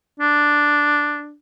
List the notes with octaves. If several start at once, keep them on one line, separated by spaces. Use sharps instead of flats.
D4